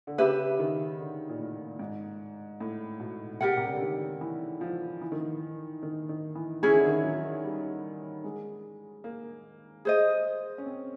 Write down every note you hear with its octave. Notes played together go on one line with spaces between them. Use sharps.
D3
C#3 G4 B4 E5
D#3
D3
A#2
A2
G#2
A2
B2
B2
C3 G4 A#4 D5 F#5
C3
C#3
D3
D#3
E3
F3
E3
D#3
E3
D#3
D#3
E3
E3 C#4 E4 G#4
D#3
D3
D#3
F#3
G3
G#3
A#3
G#4 C5 D#5
C#4
C4